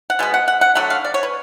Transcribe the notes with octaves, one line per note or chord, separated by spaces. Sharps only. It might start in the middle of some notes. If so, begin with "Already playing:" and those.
F#5
B2 G#3 B3
F#5
F#5
F#5
D3 F#3 A3 F#5
F5
D5
C#5
B4